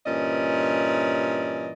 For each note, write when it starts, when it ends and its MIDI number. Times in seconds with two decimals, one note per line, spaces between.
0.06 1.73 43
0.06 1.73 46
0.06 1.73 52
0.06 1.73 61
0.06 1.73 74
0.06 1.73 75